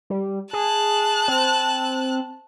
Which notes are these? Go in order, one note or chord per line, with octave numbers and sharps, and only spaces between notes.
G3
G#4 A5 F#6
C4